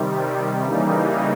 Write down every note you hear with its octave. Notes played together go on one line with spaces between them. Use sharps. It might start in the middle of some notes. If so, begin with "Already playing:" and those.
Already playing: C3 D#3 G3
C#3 E3 G3 A#3 D#4